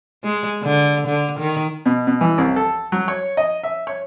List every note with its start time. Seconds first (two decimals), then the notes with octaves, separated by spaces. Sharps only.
0.24 G#3
0.63 D3
1.07 D3
1.39 D#3
1.86 B2
2.07 B2
2.21 E3
2.38 C2
2.56 A4
2.92 F#3
3.08 C#5
3.37 D#5
3.63 E5
3.87 C#5